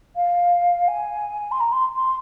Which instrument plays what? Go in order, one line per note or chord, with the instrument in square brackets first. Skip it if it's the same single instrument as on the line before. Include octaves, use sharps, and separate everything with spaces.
[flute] F5
G#5
C6
A#5
C6
C6